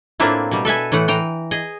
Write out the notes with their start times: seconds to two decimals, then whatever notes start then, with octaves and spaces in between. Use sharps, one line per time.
0.20 A2 A#3 C4 D4 E4 F4
0.51 B2 G3
0.65 A4 B4 E5 G#5
0.92 A2 E3 A3 F#5
1.08 E3 G5 A#5
1.51 G#4 D#5